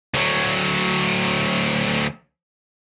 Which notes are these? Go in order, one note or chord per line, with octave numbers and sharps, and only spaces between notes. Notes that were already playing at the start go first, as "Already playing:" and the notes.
D2 F#3